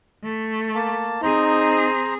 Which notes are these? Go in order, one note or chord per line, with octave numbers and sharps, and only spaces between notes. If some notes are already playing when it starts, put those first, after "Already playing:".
A3
A#3 A5
C4 D#4 G#4 C5 A#5